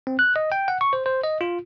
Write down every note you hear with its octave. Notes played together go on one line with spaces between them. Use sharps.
C4
F#6
D#5
G5
F#5
C#6
C5
C5
D#5
F4